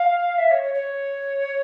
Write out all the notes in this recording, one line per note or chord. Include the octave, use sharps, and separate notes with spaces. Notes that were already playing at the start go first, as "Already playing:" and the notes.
Already playing: F5
E5
C#5
C#5
C#5